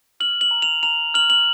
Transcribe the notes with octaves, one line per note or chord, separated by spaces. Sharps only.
F6 F#7
F#7
A#5
F7
A#5 F7
F6 F#7
F#7